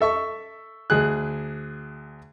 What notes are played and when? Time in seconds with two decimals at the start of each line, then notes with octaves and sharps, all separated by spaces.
0.01 A4 E5 C#6
0.90 D2 G#4 F#6